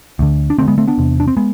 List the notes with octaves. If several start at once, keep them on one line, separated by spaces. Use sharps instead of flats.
D2 D3
D4
D2 D3 A3 C4
G#3 B3
A3 C4
B3 D4
E2 C3
D4
C4
G#3 B3